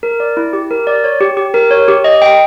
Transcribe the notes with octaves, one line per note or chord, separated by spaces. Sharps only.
A#4
D5
E4
G4
A#4
D5
C#5
G4
G4
A#4
C#5
G4
D#5
G5